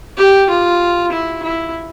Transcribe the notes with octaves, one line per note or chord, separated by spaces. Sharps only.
G4
F4
E4
E4